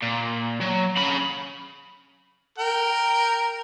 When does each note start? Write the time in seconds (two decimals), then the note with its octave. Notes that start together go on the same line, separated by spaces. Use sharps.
0.02 A#2
0.61 F#3
0.97 C#3 B5
2.58 A#4 G5